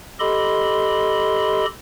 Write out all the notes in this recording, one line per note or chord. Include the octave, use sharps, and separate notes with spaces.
G4 A4 D#5 B5 C6